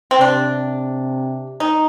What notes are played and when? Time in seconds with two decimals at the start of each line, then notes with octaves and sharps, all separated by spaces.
0.11 C4
0.21 C3 D4
1.60 D#4